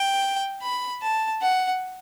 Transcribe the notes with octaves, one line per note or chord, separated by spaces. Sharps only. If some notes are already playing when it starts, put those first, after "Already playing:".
Already playing: G5
B5
A5
F#5